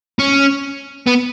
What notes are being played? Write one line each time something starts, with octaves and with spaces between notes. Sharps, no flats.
C#4
B3